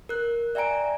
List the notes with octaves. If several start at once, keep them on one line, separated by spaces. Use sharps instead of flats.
A#4 F#6
D5 E5 G5 G#5 A#5 D7